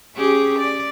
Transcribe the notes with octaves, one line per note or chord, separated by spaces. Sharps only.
C#4 G4 G#4
D5